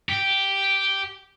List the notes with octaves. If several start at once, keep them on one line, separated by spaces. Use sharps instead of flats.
G4